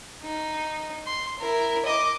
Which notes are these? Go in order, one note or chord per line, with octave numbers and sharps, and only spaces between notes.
D#4
C6
E4 A#4
D#5 D6